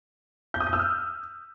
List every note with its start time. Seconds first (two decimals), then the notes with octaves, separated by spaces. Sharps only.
0.54 G6
0.60 D#6
0.67 G6
0.73 E6
0.79 F6